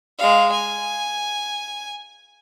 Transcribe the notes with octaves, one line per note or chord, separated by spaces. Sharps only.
G#3 F5
G#5